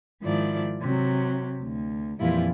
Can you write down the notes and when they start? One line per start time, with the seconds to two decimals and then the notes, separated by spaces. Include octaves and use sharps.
0.22 G#2 D#3 F3 E4 D5
0.82 C3 F#3
1.63 D2
2.20 F2 A#2 E3 G3 E4 F4